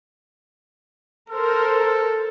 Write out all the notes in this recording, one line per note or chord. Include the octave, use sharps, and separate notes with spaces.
A4 A#4 C5